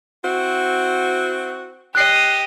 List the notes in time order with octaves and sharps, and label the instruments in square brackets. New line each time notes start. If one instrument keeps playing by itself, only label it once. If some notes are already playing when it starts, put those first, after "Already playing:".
[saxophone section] C4 E4 F#4
[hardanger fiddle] G4 D#5 [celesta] F#6 C7